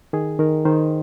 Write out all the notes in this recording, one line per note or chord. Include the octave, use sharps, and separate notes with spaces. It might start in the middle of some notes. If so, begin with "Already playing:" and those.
D#3 G#4
D#3 A#4
D#3 C5